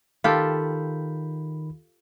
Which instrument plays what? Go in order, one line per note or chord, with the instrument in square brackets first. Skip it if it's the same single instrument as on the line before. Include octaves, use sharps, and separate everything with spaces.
[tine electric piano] D#3 B5 [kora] F4 G4 A4